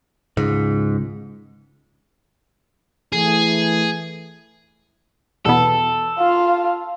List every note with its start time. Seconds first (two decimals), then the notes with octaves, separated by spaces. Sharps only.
0.37 C#2 G#2
3.13 E3 A3 G#4
5.46 E2 B2 B3 A4
6.18 F4 F5